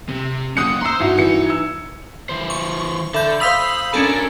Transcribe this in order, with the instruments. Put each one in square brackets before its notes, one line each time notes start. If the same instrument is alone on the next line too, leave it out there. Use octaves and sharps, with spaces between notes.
[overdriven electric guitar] C3
[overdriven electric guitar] A#3 C#4 [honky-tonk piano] D#6 F#6 C#7
[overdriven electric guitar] C5 C6 [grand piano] A#5 E6
[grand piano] G2 E4 F#4 [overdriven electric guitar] D#4
[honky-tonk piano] E3 C#7
[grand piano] E6 G#6
[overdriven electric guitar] E3 C5
[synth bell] C#6
[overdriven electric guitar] D3 [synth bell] A4 G6 [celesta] E5 B5
[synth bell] C5 F5 D#6 [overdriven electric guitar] B5 [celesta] E6 B6 F7
[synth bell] C#4 D4 A4 [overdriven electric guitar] A#4 G#5